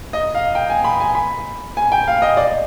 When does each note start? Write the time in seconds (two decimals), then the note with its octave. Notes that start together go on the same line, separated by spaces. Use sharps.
0.13 D#5
0.35 F5
0.55 G5
0.70 G#5
0.84 B5
1.00 G#5
1.15 B5
1.77 G#5
1.92 G5
2.08 F5
2.22 D#5
2.37 D5